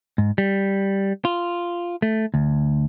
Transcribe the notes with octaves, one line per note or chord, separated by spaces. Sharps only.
G#2
G3
F4
A3
D2